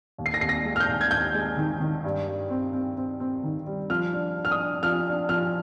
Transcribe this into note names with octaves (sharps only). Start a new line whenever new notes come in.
D#2
C7
A#6
D#2 C7
A#6
G#3
F6
G6
D#2
G#6
D#2 G6
G#3
D#3
D#3
G2
G2
C4
C4
C4
C4
D#3
G3
F3 F6
D4
D4
F6
D#6
D4
F3 F6
D4
F3 F6